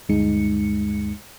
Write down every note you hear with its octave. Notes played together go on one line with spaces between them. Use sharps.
D2 G2 G#3 D#4 C#7